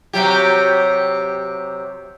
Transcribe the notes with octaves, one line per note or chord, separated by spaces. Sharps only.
C3 F#3 G4